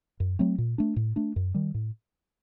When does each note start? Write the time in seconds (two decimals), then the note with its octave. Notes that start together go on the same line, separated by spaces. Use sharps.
0.20 F#2
0.39 F#3 A3 C4
0.58 A#2
0.78 A3 D4
0.96 A2
1.16 A3 D4
1.36 F#2
1.54 D#3 G3
1.74 A2